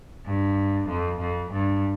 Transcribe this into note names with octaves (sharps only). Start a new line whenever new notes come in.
G2
F2
F2
G2